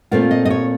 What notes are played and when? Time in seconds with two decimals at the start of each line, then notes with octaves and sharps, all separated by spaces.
0.11 A#2 A3 C4 F4
0.31 D#5
0.45 D#5
0.50 C#5